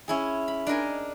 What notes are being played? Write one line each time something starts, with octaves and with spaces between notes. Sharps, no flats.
C#4 E4 G#4
B5
D4 D#4 A#4 G#5